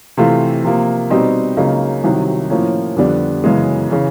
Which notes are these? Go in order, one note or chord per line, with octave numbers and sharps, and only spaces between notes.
C3 E3 A3 C4 F4
C3 F3 A#3
B2 G3 C4 D#4
C#2 C#3 F#3 A#3 D#4
C2 C3 D#3 F#3
A2 F3 A#3 C#4
F2 D3 G3 B3 D4
F#2 C#3 E3 G#3 B3
C#3 E3